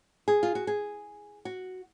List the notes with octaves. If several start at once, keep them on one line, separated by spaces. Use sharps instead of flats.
G#4
F4
F#4
G#4
F#4